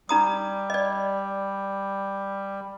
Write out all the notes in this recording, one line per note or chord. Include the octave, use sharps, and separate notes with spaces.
G3 D#4 A#5 D#6
D5 D#5